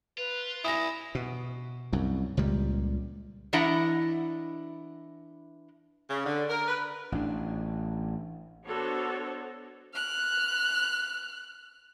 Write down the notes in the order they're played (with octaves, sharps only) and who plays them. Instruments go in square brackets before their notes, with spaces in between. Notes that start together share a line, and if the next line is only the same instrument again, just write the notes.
[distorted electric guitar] F4 [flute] B4
[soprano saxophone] E4 [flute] G#5 [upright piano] D#6 A#6
[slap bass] B2
C2 F#2
C#2 A#2 G3
[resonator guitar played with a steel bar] E3 D4 E4 D#5 F#5 A#5
[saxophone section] C#3
D3
A#4
B4
[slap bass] A1 D4
[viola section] B3 D4 F#4 A4 C5 C#5
[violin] F6 F#6